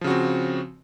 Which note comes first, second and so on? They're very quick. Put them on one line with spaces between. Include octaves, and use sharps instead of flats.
F3 C#3 F#4 C4